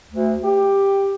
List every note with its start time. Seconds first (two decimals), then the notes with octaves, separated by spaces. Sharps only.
0.10 D2
0.43 G4